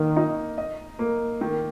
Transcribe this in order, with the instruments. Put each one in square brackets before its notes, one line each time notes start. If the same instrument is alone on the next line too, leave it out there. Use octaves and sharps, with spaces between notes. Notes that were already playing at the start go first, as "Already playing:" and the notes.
Already playing: [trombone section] D#3 [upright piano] A#3
[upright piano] D#4
D#5
A#3
D#3